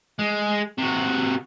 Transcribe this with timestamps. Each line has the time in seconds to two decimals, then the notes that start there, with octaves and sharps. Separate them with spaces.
0.19 G#3
0.78 C3 F#4